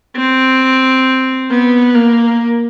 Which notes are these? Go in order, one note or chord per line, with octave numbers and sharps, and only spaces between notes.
C4
B3
A#3